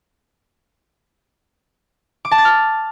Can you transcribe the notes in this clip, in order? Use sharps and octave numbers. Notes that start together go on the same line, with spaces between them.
D6
A5
A6
F6